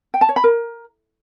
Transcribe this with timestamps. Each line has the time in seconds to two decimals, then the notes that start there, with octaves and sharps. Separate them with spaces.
0.14 G5
0.21 A5
0.29 C#5
0.36 B5
0.44 A#4